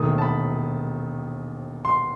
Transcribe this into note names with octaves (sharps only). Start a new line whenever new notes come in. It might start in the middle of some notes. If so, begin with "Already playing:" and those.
Already playing: E1 D#2 D#3 A3 D#6
A5
B5
C6